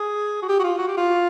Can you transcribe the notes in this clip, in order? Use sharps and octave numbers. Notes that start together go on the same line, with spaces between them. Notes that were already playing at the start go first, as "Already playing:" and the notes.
Already playing: G#4
F#4
G4
F#4
F4
F#4
G4
F4